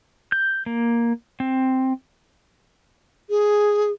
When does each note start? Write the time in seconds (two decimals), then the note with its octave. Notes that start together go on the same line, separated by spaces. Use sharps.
0.32 G6
0.66 A#3
1.40 C4
3.30 G#4